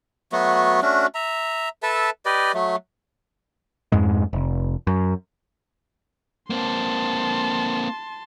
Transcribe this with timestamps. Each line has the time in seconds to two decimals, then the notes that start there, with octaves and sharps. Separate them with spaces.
0.32 F#3 A3 B3 F#4
0.82 A3 C#4 D4 F#4
1.15 E5 A#5
1.83 A4 B4 E5 A5
2.26 G4 B4 D5 D#5
2.54 F#3 A3
3.92 F2 G#2 G#3
4.33 F1
4.87 F#2
6.50 A#3 C4 A5 C6